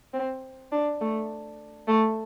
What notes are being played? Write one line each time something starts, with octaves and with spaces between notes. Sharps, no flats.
C4
D4
A3
A3